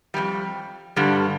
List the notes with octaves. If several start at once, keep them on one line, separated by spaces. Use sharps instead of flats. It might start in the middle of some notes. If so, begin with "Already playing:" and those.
F2 C3 G3
G2 D3 G3